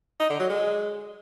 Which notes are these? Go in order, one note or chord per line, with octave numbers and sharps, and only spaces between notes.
D#4
D3
F#3
G#3